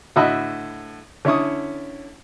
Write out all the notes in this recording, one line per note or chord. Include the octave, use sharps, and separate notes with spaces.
A2 D3 F#4 D#5 E5 B5
D3 C#4 E4 C#6 D#6